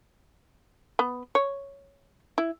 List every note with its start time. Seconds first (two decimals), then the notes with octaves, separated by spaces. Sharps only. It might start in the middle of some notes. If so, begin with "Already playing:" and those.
0.99 B3
1.35 C#5
2.38 E4